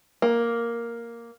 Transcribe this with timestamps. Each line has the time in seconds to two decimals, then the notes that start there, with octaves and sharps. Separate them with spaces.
0.22 A#3